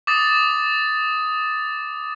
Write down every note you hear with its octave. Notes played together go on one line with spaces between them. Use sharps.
D6 D#6 A6